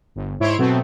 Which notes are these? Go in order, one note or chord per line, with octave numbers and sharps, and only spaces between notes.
G1
G#2 E4 C#5 C6 D7
B2 F#3 A3 B3 C4